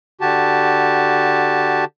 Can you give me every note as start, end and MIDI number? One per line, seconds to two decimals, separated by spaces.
0.21 1.85 50
0.21 1.85 66
0.21 1.85 67
0.21 1.85 81